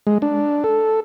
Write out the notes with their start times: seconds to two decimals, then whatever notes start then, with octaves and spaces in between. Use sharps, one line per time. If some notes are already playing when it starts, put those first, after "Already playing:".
0.07 G#3
0.22 D4
0.64 A4